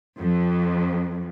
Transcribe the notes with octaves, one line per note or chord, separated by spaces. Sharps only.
F2